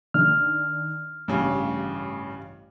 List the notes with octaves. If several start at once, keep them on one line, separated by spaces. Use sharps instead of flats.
D#3 D4 F6
A1 G2 C#3